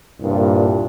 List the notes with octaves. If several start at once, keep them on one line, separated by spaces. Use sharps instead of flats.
C2 G2 A#2